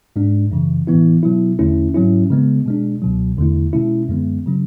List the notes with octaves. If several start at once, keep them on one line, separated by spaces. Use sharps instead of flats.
G#2 G#3 D4
F#2 C#3 E3
A2 E3 B3 E4
B2 F#3 B3 E4
E2 D3 A3 C#4 E4
G#2 F#3 C#4 E4
C#3 G#3 B3
B2 G#3 D4
C#2 B2 F#3
E2 D3 A3 E4
B2 G#3 C#4 E4
F#2 D3 G#3 B3
C#3 F#3 C#4